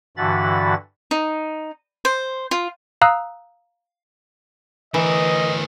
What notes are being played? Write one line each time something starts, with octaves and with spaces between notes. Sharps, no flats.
G2 D3 E3 F#4 B5 A6
D#4
C5
F4
F5 A#5 D#6 E6 F#6
D2 E3 A#4 D#5